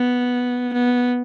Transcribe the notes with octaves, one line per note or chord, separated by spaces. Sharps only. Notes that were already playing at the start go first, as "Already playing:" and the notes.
Already playing: B3
B3